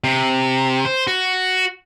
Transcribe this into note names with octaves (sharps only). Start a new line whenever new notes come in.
C3
C5
F#4